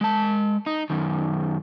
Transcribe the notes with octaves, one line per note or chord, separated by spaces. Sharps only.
G#3 A5
D#4
F#2 D#3